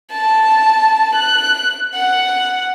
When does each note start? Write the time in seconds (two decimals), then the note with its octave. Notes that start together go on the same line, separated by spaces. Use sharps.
0.11 A5
1.15 F#6
1.94 F#5